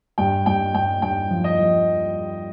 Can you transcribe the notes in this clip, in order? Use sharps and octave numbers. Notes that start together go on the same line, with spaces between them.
G2 G5
G2 G5
G2 G5
G2 G5
F3
D#5
F3